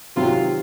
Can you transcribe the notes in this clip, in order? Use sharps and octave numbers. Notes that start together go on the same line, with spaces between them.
C3 D#3 F#3 F4